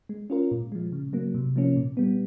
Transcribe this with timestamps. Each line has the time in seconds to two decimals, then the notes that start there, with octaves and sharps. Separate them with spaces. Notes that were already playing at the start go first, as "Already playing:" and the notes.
0.09 G#3
0.30 C#4 F4 A#4
0.51 A#2
0.72 F3 G#3
0.92 C#3
1.13 F#3 A#3
1.34 C3
1.56 F3 A#3 C#4
1.76 A#2
1.97 G3 B3